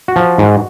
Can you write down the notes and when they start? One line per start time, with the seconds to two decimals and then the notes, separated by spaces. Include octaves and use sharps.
0.08 F#4
0.16 F3
0.38 G#2